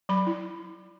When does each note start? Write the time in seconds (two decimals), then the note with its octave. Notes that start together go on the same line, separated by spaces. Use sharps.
0.09 F#3 B5
0.27 E4